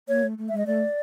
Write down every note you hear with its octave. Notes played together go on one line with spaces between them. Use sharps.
A#3 C#5
A3
A3
G#3 E5
D#5
A3 D5